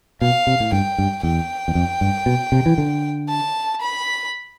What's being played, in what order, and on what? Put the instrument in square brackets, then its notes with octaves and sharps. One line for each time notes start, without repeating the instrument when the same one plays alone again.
[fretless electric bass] B2 [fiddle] F5
[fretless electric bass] C3
A2
[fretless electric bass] G2 [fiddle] G5
[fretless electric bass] G2
[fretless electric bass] E2 [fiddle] G5
[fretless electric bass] E2
F2
G2
B2
C3
E3
D3
[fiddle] A5
B5